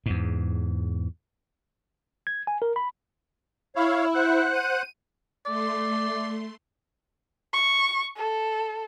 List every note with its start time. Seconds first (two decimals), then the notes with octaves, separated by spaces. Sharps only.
0.06 E2 G#2
2.27 G#6
2.47 G#5
2.62 A#4
2.76 B5
3.76 E4 C#5 F5
4.15 C5 F#5 F#6
4.53 D#7
5.46 A3 D5 C6
7.54 C#6
8.16 A4